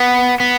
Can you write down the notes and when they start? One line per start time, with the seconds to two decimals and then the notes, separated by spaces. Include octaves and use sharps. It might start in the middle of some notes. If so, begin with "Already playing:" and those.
Already playing: B3
0.40 B3